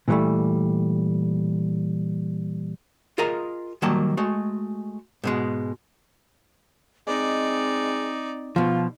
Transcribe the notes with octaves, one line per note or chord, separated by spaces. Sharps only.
A#2 E3 F#3 G3 A3
F4 G#4 A#4 D#5 A#5
D#3 F#3 G3 A#3 A5 A#5
G#3 A3 F#4
G#2 B2 G#3
G#3 C4 D#4 D5
B2 F3 F4